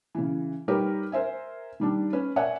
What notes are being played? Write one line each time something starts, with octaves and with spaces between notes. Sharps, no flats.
C#3 E3
G3 D#4 G4 A#4 B4 C#5
A#4 C5 E5 G#5
D#3 G3 D4
C#4 B4
A#4 C#5 D5 E5 F#5 G#5